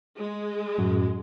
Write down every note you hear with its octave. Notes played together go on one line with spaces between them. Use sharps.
G#3
F#2 A2 F#4